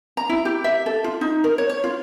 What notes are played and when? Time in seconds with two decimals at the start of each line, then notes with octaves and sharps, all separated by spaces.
0.17 A#5
0.29 E4
0.45 G4
0.64 E5
0.86 A4
1.04 F4
1.21 D#4
1.44 A#4
1.58 C#5
1.70 C#5
1.84 F4